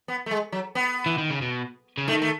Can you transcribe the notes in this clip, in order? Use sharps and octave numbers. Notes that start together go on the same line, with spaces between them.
B3
A3
G#3
F#3
B3
E3
D#3
C#3
B2
C#3
D#3 A3
A3